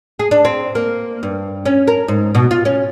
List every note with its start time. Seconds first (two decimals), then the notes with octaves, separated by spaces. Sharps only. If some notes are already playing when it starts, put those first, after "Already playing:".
0.19 G#4
0.31 D4
0.45 C4
0.75 A#3
1.23 G2
1.65 C#4
1.88 A#4
2.08 G#2
2.35 B2
2.51 F4
2.65 C#4